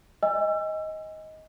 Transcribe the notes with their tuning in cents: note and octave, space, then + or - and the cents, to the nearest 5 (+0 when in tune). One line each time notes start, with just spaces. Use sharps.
D#5 +15 G#5 -35 E6 +30